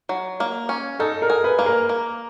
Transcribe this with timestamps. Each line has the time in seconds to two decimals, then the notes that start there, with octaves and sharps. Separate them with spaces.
0.09 F#3
0.40 A#3
0.69 C#4
0.99 D#4 A4
1.22 A#4
1.30 G#4
1.44 B4
1.59 A#3
1.66 A#4
1.89 A#3